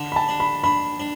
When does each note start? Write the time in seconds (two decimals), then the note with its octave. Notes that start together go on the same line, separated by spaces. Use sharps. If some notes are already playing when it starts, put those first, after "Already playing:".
Already playing: D3
0.12 B5
0.16 A5
0.29 D4
0.40 B5
0.64 D4 B5
1.00 D4